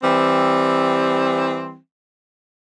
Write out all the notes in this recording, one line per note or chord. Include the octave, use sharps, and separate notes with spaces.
E3 G3 C4